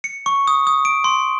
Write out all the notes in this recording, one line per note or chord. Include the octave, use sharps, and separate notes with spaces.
C#7
C#6
D#6
D#6
D7
C6